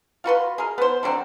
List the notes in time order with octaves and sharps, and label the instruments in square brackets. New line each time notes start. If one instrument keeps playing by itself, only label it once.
[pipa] F4 F#4 B4 C6
G#4 A#4
B3 C5
D3 F#3 C4 D4